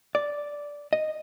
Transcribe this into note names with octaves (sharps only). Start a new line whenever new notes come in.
D5
D#5